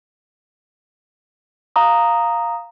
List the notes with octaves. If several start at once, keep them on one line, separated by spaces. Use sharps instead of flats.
F5 A#5 D#6